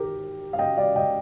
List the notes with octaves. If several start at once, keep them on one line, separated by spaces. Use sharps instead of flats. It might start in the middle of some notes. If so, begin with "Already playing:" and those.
Already playing: D#3 G4 A#4
F5
D#5 G5
D5 F5
D#5 G5